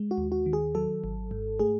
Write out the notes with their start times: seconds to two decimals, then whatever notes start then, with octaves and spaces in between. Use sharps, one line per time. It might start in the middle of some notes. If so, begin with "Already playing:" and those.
Already playing: G#3
0.11 F#4
0.18 D#2
0.32 F#4
0.46 D#3
0.53 G#4
0.75 F#3 A4
1.04 G#1
1.31 G#2
1.59 A3 G#4